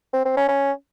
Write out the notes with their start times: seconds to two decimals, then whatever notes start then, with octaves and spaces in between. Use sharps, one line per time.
0.13 C4
0.25 C4
0.37 C#4
0.49 C#4